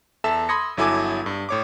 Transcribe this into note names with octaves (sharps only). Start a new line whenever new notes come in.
E2 A4 E5 A5 E6 E7
B5 C6 D#6 G#6 A#6 C#7
G1 F#3 E4 A4 G#5 D6
G2
A2 C#5 D6